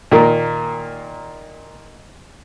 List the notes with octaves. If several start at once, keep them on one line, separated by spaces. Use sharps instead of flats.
A#2 D#3 A#3